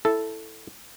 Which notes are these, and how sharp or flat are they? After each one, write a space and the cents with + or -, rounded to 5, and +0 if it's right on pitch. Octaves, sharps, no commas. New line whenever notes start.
E4 +0 A4 +0